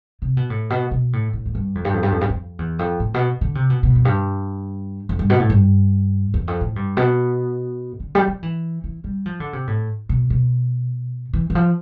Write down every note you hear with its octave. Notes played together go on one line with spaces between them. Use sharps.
C3
B2
A2
B2
B2
A2
A2
F2
G2
F2
G2
F2
G2
F2
G2
F2
E2
F2
A2
B2
D3
C3
B2
B2
F2
G2
F2
G2
B2
A2
G2
E2
F2
A2
G2
B2
D3
G3
F3
E3
E3
G3
F3
D3
C3
A2
B2
B2
E3
E3
F3